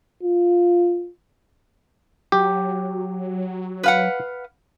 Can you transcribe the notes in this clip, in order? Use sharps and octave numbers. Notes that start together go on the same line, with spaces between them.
F4
F#3 G4
B4 F5 F#5